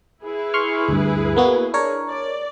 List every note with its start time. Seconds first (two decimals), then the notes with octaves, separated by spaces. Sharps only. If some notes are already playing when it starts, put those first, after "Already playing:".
0.23 E4 G#4 B4
0.54 C6 C#6 F6
0.88 D2 G2
1.36 A#3 B3 F#4
1.74 D4 A#4 C#5
2.09 D5